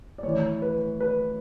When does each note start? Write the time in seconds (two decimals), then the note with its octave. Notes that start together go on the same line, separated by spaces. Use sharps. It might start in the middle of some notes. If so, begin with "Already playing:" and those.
0.18 D5
0.23 A2 E3 C#5
0.62 B4
1.00 B4